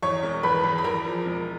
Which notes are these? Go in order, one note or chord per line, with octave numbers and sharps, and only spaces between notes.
E2 C#5 C#6
E1
E2 B4 B5
E2
B5
E2 A#4 A#5
F3
E1